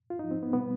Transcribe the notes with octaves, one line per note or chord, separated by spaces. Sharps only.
F4
G#2 F3 D#4
C4
B3
B2 G3 B3